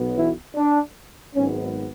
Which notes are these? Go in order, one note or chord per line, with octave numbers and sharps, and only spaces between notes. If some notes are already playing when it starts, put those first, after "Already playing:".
Already playing: B1 B2 F#3 B3
E3 E4
D4
G#1 G#2 F#3 B3 C#4